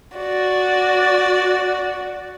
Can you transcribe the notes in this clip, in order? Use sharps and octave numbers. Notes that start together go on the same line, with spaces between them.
F#4 D5